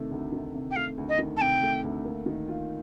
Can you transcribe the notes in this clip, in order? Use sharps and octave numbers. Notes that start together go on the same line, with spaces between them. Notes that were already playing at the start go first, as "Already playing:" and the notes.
Already playing: C3 D#3 A3
D2
D#3
C3
G5
A3 F5
D2
D#5
D#3
A5
C3 G5
A3
D2
A#3
D#3
F4